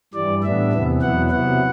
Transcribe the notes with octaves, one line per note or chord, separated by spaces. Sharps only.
G2 E3 G3 D5
A2 G3 B3 D4 E5
E2 C3 E3 B3
E2 B2 F#3 B3 E4 F#5
C3 F#3 B3 E4 F#5